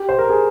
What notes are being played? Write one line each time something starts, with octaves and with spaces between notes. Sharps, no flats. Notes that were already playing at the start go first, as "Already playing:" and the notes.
Already playing: G4
C5
A#4
G#4